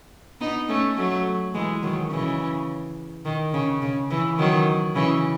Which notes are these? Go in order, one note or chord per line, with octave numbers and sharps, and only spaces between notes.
B3 D#4
A3 C#4
F#3 A3
E3 G#3
D#3 F#3
C#3 E3
D#3
C#3
C#3
C#3 E3
D#3 F#3
C#3 E3